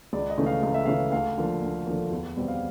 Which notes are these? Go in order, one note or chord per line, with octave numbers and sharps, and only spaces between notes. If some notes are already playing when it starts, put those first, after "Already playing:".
C#2 D5
D#5
C#3 E3 A3 C#4
F5
C#2 F5
E5
C#3 E3 A3 C#4 F5
D2 F5
D3 F3 A#3
D2
D3 F3 A#3
E2
B2 G3 C4
F5